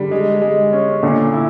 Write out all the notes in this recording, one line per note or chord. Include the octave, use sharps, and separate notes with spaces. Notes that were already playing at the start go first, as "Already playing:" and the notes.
Already playing: D3 G3
G#3
G#3
C#4
A#2 D3
E4